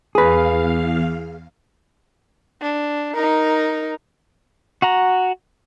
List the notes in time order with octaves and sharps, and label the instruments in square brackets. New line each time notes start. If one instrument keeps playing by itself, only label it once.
[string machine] E2 F5 [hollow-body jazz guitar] G#4 B4
[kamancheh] D4
D#4 A#4
[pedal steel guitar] F#4 F#5 A#5